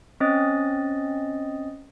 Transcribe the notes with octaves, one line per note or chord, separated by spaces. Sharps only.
C4 C#4 D#5 D#6 A6